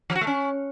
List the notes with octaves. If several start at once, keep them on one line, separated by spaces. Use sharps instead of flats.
F3
F#4
A3
C#4